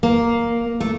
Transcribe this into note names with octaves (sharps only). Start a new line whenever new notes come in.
A#3
A3